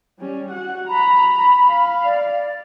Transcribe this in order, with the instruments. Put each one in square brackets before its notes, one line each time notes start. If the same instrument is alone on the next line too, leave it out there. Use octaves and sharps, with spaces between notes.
[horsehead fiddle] G3 C#4
F#4 F#5
[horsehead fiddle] A#5 [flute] B5
[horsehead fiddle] F5
[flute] D5